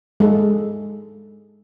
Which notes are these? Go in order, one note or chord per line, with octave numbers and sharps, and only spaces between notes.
G#3 A4